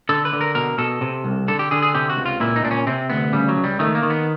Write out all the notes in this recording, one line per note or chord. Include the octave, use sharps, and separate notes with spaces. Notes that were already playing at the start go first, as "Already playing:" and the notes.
D3 A4
B4
D3
A#4
B2 A#4
B2 A4
C3
C2
D3 A4
G4
D3 G#4
G#4
C3 G4
F#4
C#2
F4
A#2 E4
D#4
A#2 D4
C#4
C3 C4
D2 B3
C#3 G3
F#3
C#2
G3
D#3 A3
A#3
D#3
B3